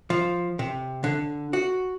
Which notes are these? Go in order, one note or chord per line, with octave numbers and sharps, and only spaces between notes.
F3
C3
D3
F#4